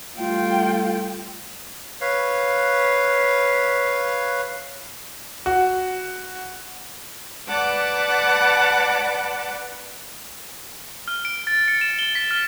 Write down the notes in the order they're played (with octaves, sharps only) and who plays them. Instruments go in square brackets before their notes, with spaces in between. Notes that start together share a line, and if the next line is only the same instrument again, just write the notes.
[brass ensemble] G3 A3 [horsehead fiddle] F4 G5
[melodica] B4 C#5 F5
[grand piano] F#4
[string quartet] B4 D5 F#5 A5 D6
[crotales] F6
D7
A6
C#7
E7
G7
B6
F6